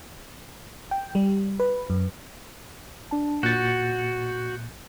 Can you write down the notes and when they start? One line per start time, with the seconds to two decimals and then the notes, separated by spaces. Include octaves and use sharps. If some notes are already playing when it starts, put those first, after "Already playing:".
0.91 G5
1.15 G3
1.60 B4
1.90 F#2
3.11 D4 A5
3.43 A#2 F#4 F#6 G6 A6 C#7